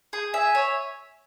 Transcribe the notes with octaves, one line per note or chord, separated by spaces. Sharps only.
G#4
E5 G#5
C#5